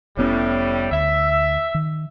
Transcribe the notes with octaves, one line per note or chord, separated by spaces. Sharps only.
F1 A2 G3 B3 C#4
D2 E5
D#3